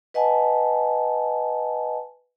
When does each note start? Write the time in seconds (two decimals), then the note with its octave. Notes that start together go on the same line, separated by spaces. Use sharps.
0.14 B4 D#5 F#5 G#5 A5